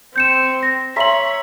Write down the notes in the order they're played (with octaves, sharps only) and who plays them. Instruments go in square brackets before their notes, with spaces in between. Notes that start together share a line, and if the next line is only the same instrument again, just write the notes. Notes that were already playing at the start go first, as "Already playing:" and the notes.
[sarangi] C4 [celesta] G6 C#7 E7
[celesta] A#6
[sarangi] C#5 [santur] E5 A#5 C6 [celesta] B6 F#7